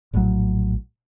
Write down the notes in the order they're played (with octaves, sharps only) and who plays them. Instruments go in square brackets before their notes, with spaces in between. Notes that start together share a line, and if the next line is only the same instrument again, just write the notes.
[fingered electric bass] A#1 A2 C3 F#3